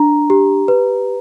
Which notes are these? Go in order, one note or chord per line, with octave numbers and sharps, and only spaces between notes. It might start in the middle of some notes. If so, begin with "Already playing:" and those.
Already playing: D4 A#5
G4
B4